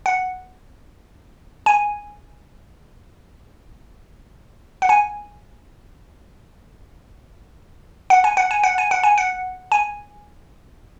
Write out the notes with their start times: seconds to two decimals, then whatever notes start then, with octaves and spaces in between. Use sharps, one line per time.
0.06 F#5
1.66 G#5
4.82 F#5
4.89 G#5
8.10 F#5
8.24 G#5
8.37 F#5
8.51 G#5
8.64 F#5
8.78 G#5
8.91 F#5
9.04 G#5
9.18 F#5
9.72 G#5